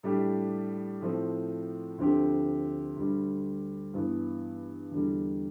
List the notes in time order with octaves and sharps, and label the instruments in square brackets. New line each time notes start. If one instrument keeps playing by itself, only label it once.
[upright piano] A2 G3 D4 G4
A2 F3 C4
D2 D3 F3 C4 G4
D2 D3 G3
G2 E3 B3
E2 D3 G3